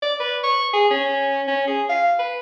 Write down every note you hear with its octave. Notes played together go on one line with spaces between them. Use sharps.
D5
B4
C#6
G#4
C#4
C#4
G#4
F5
B4